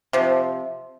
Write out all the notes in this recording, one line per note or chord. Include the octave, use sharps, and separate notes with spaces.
C3 F3